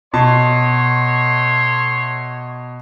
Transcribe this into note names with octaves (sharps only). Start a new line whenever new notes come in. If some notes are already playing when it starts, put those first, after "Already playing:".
B2 A3 C#5 A5 C6